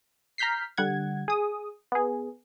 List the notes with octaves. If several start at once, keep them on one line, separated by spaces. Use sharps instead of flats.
A#5 F6 G6 B6 C7
D3 G3 F#5 G#6
G#4 D#6
B3 G#4